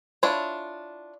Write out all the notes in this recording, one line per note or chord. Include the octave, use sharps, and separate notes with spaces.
D4 E4 F4 C#5